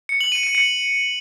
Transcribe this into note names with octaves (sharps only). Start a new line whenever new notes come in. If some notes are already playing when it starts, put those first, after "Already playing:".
C#7
F#7
D#7
D#7
C#7